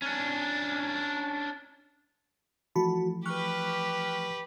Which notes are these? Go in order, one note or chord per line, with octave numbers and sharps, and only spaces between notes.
C#4 D4
E3 F3 A3 F#4 A5 B5
G4 B4 C#6 F6 F#6